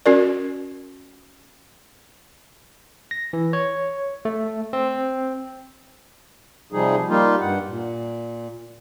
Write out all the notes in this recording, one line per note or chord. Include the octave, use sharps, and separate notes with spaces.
C#4 F#4 A#4 D5
A#6
E3
C#5
A3
C4
C3 F3 G3 D#4 G#4
G3 A#3 D#4 F4
G2 F#5
A#2